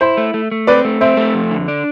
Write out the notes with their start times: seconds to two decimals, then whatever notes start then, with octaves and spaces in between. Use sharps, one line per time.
0.01 E4 C5
0.17 A3
0.34 A3
0.51 A3
0.67 C4 B4 D5
0.85 A3
1.01 C4 C5 E5
1.17 A3
1.34 F2
1.51 D3
1.68 D4